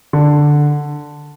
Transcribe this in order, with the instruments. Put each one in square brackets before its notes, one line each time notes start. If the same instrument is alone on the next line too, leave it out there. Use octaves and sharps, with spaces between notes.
[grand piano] D3